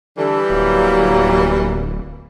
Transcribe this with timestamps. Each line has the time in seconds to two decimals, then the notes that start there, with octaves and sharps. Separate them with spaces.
0.17 D3 E3 G3 A4
0.50 D1 F#3 A#3